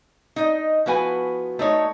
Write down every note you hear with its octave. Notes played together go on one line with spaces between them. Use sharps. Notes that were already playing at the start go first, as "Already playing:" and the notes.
D#4 D#5
F3 B3 E4 F#4 B4 G#5
A3 D#4 C#5